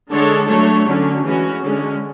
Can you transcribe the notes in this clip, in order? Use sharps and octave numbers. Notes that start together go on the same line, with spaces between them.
D3 G#3 D4 A4 C#5
F#3 A3 D4 A4 C#5
D3 F#3 C#4
E3 G#3 C#4 F#4
D3 G#3 C#4